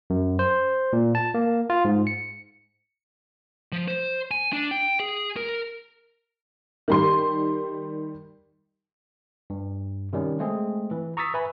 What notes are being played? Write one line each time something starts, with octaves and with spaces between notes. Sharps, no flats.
F#2
C5
A#2
A5
A#3
F4
G#2
C#7
F3
C5
G#5
D4
G5
G#4
A#4
D#3 G3 C6
G2
C3 D#3 G3 C#4
G#3 A3 C4 G#4
E3
A#5 C#6 D#6 E6 A6 B6
B4 E5 G#5 B5